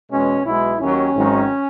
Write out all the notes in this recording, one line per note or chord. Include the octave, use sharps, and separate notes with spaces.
E2 B2 G#3 C#4
B1 B2 G#3 E4
D#2 D#3 F#3 C#4
G#1 G#2 D#3 F#3